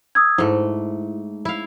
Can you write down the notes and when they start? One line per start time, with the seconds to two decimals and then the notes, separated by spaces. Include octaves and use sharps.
0.15 D#6 E6 G#6
0.38 G#2 A3 E4
1.45 E4 F5